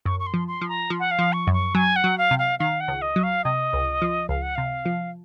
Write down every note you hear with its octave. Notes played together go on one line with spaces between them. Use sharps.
F#2 C#6
C#6
C6
F3
C6
F3
A#5
F3
F#5
F5
F3
C#6
F#2
C#6
F#3 G#5
F#5
F#3
F5
C3
F5
D#3 F5
F#5
C#2
D#5
F#3
F5
C3 D#5
C#2
F3
C#2 F5
F#5
C3 F5
F3